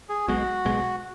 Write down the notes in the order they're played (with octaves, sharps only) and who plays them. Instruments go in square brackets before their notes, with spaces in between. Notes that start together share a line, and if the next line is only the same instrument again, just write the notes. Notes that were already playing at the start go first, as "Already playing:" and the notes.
[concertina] G#4
[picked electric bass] B1 B2 G#3 [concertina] F#4
[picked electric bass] B1 B2 G#3